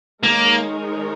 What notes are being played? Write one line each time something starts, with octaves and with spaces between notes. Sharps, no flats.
D#3 G#3 A#3 D#4 A#4 C#5